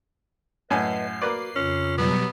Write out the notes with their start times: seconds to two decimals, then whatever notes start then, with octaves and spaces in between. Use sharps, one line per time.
0.70 F#2 A2 B4 D#5 G#5 C7
1.22 A#3 F#4 B4 D5
1.56 F2 C#3 C#4 F4
1.98 B2 F#3 G3 B3